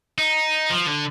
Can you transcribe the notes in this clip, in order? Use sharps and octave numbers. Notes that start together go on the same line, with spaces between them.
D#4
F3
D3